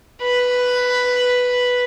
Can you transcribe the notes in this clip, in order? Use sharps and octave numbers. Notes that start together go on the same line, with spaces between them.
B4